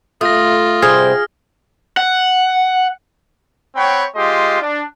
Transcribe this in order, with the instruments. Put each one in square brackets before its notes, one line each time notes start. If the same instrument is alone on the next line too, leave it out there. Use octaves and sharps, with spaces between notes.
[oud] A3 [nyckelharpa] F4 [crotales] D#6 A#6
[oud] C3 G3 C4 [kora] G#4 [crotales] F6
[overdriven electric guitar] F#5
[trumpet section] C4 C#5 F#5 G5 B5
G#3 F4 G4 D#5 C6
D4